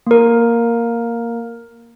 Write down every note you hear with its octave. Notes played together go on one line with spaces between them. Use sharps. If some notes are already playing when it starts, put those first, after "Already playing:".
A#3 A#4